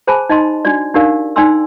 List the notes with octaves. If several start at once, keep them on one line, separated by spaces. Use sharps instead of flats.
G#4 C5 G#5 A5 B5
D#4 D#5 A5 C6
D4 F#4 D5
D4 D#4 G4 A#4 D5 F5
D#4 D5 G5 G#5 C6 E6